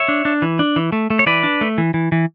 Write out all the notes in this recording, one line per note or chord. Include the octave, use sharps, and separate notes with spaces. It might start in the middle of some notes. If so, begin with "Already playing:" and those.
Already playing: C#5 E5
D4
D4
E3
D4
E3
A3
A3
C#5
E3 B4 D5
D4
A3
E3
E3
E3